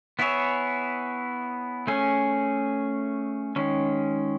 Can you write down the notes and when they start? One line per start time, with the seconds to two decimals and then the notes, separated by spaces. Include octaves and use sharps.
0.19 B3 E4 G#4 C#5 E5
1.87 A3 C#4 G#4
3.56 D#3 G#3 C#4